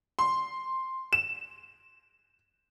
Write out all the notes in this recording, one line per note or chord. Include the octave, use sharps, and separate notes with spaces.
C6
E7